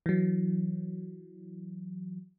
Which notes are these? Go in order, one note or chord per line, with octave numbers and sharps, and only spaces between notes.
E3 F#3